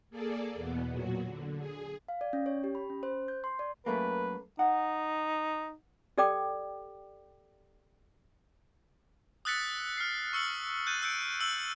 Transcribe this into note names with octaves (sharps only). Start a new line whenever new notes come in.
A#3 G#4 A4 D5
E2 B2 B3
A#2 F#3 F#4
D3
G#4
F5
D5
C#4
C#5
G4
B5
C#4
C5
G6
C6
D5
F#2 A3 A#3 B4
D#4 F#5
G4 A4 D5 G5 D6
D#6 E6 F#6 A6 B6 C#7
F6 C7
C#6 E6 C#7 F#7
F#6 G6 A6 D#7
E6 F#6 G6 C#7 D7
E6 F#7